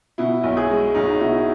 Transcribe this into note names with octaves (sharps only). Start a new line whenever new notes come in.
B2 E4
B1
G#4
G#3
B1 D#4
B2 E4